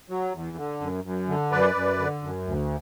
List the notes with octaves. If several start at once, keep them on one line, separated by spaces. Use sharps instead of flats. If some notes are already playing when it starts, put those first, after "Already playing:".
F#3
E2
D3
F#2
F#2
D3
F#2 B4 D5
F#2
D3
F#2
D2